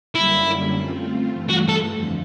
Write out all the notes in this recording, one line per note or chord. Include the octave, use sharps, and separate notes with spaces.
F#2 D3 G3 A#3 C#4 E4
A3 C4 F4
G2 E3 A3
F#4
A4
F2 D3 F3